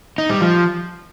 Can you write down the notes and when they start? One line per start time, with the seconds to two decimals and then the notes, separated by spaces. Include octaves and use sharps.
0.18 D#4
0.29 G3
0.41 F3